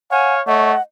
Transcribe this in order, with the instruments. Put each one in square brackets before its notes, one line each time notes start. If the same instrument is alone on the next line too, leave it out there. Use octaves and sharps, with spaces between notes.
[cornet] C#5 [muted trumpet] F5 [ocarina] F#5 [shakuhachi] G#5
[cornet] A3 [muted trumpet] C#5 [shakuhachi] D#5 [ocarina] F#5